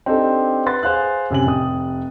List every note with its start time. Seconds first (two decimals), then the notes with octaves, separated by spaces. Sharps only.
0.06 C4 D4 D#4 G4 A4
0.66 B4 F#5 C6 A6
0.83 G#4 C5 F5 F#5 F#6
1.30 F#2 C3 G#5 F#7
1.46 F1 G5 D#6